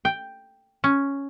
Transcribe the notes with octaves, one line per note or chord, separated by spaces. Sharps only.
G5
C#4